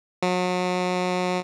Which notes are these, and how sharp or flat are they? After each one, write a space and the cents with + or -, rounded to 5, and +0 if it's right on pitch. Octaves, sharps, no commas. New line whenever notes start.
F#3 -35